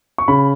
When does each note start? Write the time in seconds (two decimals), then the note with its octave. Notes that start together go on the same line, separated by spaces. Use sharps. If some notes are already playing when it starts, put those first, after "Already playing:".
0.18 C#6
0.28 C#3 B5